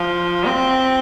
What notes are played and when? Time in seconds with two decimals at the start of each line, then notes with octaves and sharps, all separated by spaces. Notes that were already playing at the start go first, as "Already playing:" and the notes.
Already playing: F3
0.46 C4